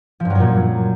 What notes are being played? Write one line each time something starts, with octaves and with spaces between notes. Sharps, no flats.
F3
G2
F#3
F#2
A#2